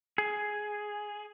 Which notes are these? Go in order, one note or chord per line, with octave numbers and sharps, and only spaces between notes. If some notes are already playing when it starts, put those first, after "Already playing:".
G#4